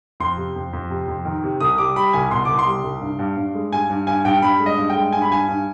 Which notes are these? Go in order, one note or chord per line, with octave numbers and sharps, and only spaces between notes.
F2 C6
C3
F2
F2
C3
F2
D#3
C3
C2 D#6
G3 D6
G3 B5
C2 G#5
B2 C6
C2 D6
C6
G3
C2
G2
G2
G2
G#3
G2 G#5
G2
G2 G#5
G2 G5
G2 B5
G#3
D#5
G2
G5
G#3
G2 G#5
B5
G2 G#5
G2